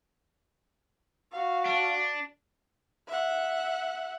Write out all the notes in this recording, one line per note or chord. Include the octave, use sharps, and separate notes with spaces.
F#4 F5
D4
E5 F#5